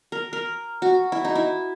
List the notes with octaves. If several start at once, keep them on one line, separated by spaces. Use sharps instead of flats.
A#4
A#4
F#4
E4
D#4
E4